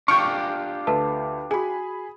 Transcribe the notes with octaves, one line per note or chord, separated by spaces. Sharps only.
D4 F4 G4 C#6 F6 G6 D7
D2 A4 B4 A5
F#4 G#4 G#5 B5